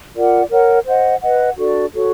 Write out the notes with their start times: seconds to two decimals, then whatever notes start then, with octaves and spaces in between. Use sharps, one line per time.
0.14 F4 A#4 D5 F#5
0.50 A#4 C#5 F#5
0.85 C5 D#5 F#5
1.21 B4 D#5 F#5
1.57 D4 F#4 A4 D5
1.93 F#4 A4 C#5